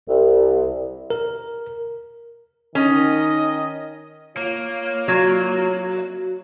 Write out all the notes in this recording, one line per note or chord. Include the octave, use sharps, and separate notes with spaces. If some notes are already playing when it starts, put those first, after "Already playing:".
C2
A#4
D#3 C#4 D#5
A#3 F4 C#5
F#3 F#4